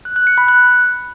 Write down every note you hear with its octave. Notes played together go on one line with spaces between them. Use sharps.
F#6
F#6
C#7
B5
F#6